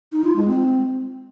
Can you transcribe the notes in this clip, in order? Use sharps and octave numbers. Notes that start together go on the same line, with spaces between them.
D#4
F4
G#3
C4